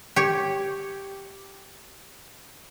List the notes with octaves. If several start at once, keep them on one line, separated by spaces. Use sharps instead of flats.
G4 C#5